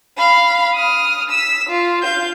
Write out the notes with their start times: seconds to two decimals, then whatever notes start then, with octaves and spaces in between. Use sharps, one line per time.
0.18 F5 B5
0.74 D#6 F6
1.30 E6 B6
1.70 F4
2.02 F5 G6